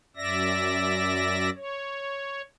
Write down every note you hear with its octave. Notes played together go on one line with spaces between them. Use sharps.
F#2 D5 E5 A#6
C#5